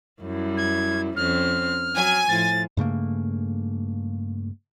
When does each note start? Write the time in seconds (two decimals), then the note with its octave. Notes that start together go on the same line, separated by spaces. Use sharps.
0.22 F#2 G3 E4
0.57 G#6
1.16 F2 C4 C#4 F6
1.96 F#3 G#5
2.29 A2 F3 A6
2.77 G2 C#3 A3 A#3